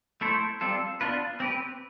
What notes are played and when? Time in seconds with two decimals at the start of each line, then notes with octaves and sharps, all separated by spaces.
0.21 A3 E4 A4 C5
0.61 G3 C4 F4 A4
1.01 B3 D4 F4 B4
1.40 C4 G4 B4